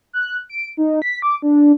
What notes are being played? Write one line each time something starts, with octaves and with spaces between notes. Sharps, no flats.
F#6
D7
D#4
B6
D6
D4